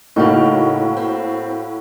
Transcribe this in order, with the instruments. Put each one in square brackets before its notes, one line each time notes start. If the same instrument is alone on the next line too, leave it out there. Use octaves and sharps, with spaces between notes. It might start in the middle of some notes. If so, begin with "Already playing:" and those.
[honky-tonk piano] A2 A#3 F#4 [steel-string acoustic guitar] C#3 D#4
[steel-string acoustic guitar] C4